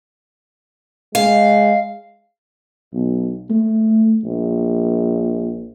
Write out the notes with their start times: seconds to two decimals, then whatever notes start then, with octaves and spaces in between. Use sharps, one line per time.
1.15 G#3 F5
2.94 B1
3.50 A3
4.24 A#1